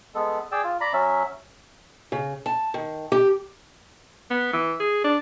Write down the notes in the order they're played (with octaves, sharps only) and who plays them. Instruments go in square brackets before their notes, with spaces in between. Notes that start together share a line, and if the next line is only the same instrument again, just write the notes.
[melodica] G#3 B3 A4
G#4 D5 G5 E6
F4
D5 A#5 B5
F#3 C#4 E5
[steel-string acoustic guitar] C#3
A5
D#3
G4
[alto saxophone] B3
E3
G#4
D4